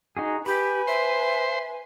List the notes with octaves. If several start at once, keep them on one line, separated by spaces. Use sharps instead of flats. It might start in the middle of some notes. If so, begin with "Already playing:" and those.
D#4 F#4 G#4
G4 B4 G#5 B5
C5 E5